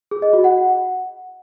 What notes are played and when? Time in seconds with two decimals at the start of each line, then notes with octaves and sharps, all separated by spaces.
0.11 G#4
0.22 D#5
0.33 F#4
0.44 F#5